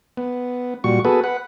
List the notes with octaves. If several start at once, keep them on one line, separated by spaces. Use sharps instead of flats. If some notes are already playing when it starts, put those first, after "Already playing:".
B3
A#2 G3 F#4 C#6
B3 F#4 G#4 A4 B4
B4 F#5